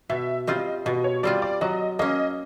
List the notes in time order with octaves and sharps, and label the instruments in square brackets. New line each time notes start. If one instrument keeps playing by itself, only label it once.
[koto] B2 [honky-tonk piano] E5
[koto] G3 C4 F4 [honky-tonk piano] D#5
[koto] B2 [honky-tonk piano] D#5
[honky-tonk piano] C#5
[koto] G3 C4 F4 [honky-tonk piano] D5
[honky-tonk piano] D5
[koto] F#3 [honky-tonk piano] D#5
[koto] A#3 C#4 [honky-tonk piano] D#5